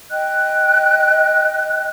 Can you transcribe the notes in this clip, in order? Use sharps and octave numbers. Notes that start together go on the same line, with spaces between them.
D#5 G5 F#6